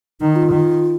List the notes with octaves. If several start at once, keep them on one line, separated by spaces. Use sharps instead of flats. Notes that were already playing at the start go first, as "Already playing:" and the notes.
D#3 D#4
F4
D#3